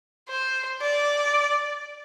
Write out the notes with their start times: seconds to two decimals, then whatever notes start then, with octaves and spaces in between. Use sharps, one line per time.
0.29 C5
0.81 D5